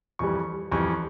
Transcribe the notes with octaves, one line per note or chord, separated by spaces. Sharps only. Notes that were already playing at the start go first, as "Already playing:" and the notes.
F2 E3 G3 C#6
F2 E3 G3 C#6